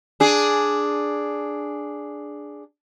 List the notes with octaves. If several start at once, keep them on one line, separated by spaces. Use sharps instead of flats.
D4 G#4